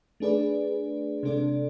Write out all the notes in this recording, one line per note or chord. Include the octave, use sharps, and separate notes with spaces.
A3 D4 G#4 B4 D5
C3 G#3 D4 A4 D5